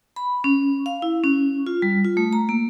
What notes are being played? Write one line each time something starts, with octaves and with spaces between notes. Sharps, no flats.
B5
C#4
F5
E4
C#4
F4
G3
F4
A3
A#5
A#3